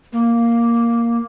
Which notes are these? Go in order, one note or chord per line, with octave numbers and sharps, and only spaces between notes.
A#3